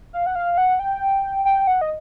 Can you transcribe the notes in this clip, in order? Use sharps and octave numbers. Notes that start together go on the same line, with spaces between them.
F5
F#5
F5
F#5
G5
G5
F#5
D#5